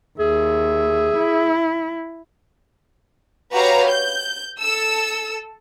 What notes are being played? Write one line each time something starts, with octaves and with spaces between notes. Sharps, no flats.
D#2 G#4 E5
E4
F#4 G4 B4 C#5 F5 A#5
G6
A4 E6